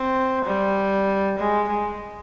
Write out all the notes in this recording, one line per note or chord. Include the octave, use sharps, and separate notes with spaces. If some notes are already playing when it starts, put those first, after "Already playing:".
Already playing: C4
G3
G#3
G#3